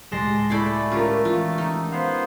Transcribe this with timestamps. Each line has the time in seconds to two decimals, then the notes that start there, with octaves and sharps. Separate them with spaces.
0.12 C#2 A2 G#3 G4 A5 C6 A#6
0.50 A3 E4 A4 D5 B5 G6 C7
0.91 C#4 F4 G4 A#4
1.25 E3 F4
1.58 D#4
1.92 B3 C5 F5